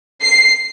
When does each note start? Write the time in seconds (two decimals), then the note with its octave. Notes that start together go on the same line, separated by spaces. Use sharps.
0.21 C7